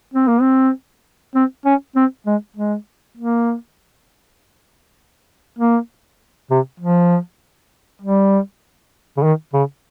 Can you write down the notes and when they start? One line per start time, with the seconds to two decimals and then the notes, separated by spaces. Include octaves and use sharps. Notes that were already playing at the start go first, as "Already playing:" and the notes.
0.14 C4
0.28 A#3
0.41 C4
1.35 C4
1.65 C#4
1.96 C4
2.27 G#3
2.56 G#3
3.17 A#3
5.59 A#3
6.50 C3
6.80 F3
8.02 G3
9.17 C#3
9.23 D#3
9.54 C#3